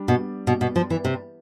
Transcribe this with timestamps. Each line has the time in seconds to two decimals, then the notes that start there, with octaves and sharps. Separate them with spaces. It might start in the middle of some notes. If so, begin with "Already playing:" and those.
Already playing: G3 D4
0.08 B2
0.47 B2
0.61 B2
0.76 F3
0.90 E3
1.05 C3